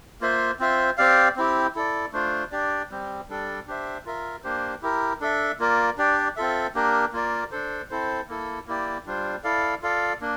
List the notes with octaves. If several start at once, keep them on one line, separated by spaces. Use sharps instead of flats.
A#3 F4 C5 E5
C4 F4 C5 E5
C4 G4 D5 F5
C4 E4 G4
E4 A4 D5
A3 D4 F4 C5
D4 G4 D5
G3 C4 G4
G3 D4 A4 D5
D4 G4 C5 E5
F4 A#4 E5
A#3 D4 G4 C5
E4 G4 A#4
D4 A4 E5
A#3 F4 A#4 D5
D4 G4 D5
C4 F4 A4 E5
A#3 D4 G4 A#4
A#3 F4 A#4 D5
D4 A4 C5
C4 E4 A4 C5
A#3 E4 A4
A#3 E4 G4 D5
G3 D4 F4 C5
E4 A4 D5 F5
F4 A4 D5 F5
A#3 D4